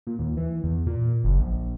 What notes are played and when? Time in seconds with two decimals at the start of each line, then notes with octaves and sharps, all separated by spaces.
0.07 A#2
0.19 D#2
0.37 E3
0.64 E2
0.87 A#2
1.24 F#1
1.39 A#1